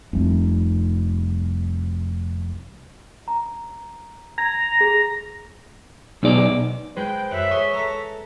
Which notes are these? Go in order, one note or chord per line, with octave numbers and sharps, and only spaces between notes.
F1 C2
A#5
A#5 G#6
G#4
B1 B3 D#4 G#4 D5
G#3 G#4 B4 C5 G5
F#2 E5 F#6
G#4 C#5 C6
A4 A#5